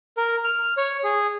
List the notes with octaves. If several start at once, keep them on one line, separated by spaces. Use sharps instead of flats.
A#4
F6
C#5
G#4